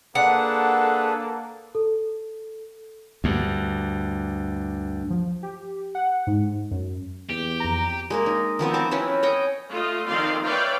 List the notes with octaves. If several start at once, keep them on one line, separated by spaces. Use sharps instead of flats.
A#3 D4 G#4 A4 B4 F#5
A4
D2 G2
F3
G4
F#5
G#2
F#2
E2 G4
F2 A#5
G#3 A#3 A#4
D#4
D#3 F3 B3 C4
C5 A5 C#6 D6
C4 C#4 E4 B4
C#5 D#5 G5
A3 F4 D#5
D#3 F3 C4 D5 F5 C6
B4 C#5 D5 E5 F5 G5